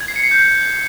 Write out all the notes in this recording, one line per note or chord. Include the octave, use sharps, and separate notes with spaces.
G#6
C7
C#7
C7
G6